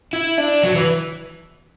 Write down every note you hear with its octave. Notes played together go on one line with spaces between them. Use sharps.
E4
D4
F#3
E3